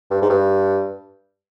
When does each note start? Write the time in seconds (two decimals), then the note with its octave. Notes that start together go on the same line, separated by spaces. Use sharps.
0.11 G2
0.22 G#2
0.30 G2